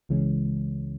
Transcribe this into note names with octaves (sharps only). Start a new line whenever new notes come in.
C#2 C#3 E3 G#3 C#4